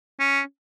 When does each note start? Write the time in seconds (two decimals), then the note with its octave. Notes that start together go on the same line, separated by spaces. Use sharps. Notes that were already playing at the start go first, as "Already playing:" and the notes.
0.20 C#4